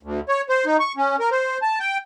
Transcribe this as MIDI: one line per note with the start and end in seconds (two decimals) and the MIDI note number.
0.03 0.20 38
0.29 0.41 73
0.49 0.65 72
0.66 0.77 63
0.80 0.92 85
0.97 1.16 61
1.20 1.30 70
1.32 1.58 72
1.62 1.79 81
1.80 1.97 79